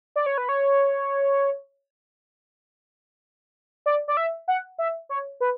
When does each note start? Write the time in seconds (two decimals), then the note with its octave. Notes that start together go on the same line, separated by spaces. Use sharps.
0.16 D5
0.26 C#5
0.38 B4
0.49 C#5
3.86 D5
4.08 D5
4.17 E5
4.48 F#5
4.78 E5
5.09 C#5
5.41 B4